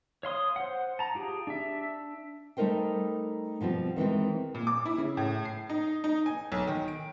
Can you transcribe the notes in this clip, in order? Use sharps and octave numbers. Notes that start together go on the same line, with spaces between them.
C#5 F5 C6 D#6
C5 F#5
A5 A#5
F4 G4 G#4
D4 E5
G3 A3 D#4 A#4 C5 G5
B2 F3 G3 C4
D#3 E3 G#3 C4
A#2
D6
E4
C#3
A2
C7
D#4
D#4
G#5
B1
D#3
D7